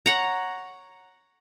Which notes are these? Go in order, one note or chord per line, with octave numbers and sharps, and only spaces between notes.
C#5 F#5 A#5